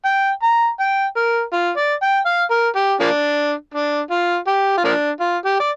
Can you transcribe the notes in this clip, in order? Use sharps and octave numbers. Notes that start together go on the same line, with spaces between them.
G5
A#5
G5
A#4
F4
D5
G5
F5
A#4
G4
F3 A#3 D4
D4
F4
G4
F4
F3 A#3 D4
F4
G4
D5